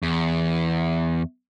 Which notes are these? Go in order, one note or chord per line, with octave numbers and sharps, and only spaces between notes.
E2